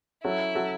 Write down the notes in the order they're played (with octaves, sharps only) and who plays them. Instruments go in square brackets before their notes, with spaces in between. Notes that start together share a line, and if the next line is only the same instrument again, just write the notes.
[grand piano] F#3 C#4 F#4 A4 [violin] E4
[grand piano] F#3 C#4 F#4 A4